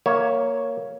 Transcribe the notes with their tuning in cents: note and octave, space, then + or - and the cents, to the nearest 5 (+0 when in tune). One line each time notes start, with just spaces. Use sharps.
A#3 +0 C#5 +0 E5 -15